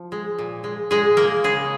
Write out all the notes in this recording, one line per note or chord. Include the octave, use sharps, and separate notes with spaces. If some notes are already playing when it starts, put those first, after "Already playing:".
Already playing: F3
G#3
A#2
G#3
A#2 G#3 G#4
G#3 A#3 A#4
C#3 G#3 G#4